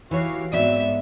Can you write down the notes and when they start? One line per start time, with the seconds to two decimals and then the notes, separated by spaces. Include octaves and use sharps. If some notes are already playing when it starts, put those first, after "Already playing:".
0.11 E3 F#4 G4 C#5 F5
0.53 G#2 F#3 B3 C4 D5 E5